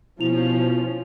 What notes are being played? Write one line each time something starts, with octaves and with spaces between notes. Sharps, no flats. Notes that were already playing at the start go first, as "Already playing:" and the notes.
B2 F3 C#4 E4 F7